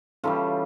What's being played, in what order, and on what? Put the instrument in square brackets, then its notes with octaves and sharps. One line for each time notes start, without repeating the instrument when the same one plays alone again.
[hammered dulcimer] C#3 E3 G3 F4 A4